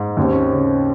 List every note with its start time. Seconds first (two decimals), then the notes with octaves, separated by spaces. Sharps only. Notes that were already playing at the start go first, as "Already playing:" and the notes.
Already playing: G#2
0.17 D#2 C#4
0.24 C4
0.31 C#4
0.52 C#3 C#4